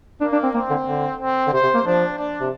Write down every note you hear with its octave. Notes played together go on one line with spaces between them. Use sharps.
A#3 D4
D4
C4
A#3 C4
D3
D3
C4
D3
C3 C5
C3
A#3
F3 D4
D4
C3